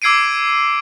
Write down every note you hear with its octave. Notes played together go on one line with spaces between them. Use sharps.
D6 E6 G#6 C7 D7 D#7